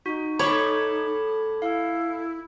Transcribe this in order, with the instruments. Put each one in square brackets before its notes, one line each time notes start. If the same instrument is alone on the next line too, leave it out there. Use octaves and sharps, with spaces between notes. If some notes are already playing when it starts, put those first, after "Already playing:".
[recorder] D#4 [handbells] F#4
[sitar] A2 A3 [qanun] C#5 [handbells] B5 D6 G#6
[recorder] E4 [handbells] F5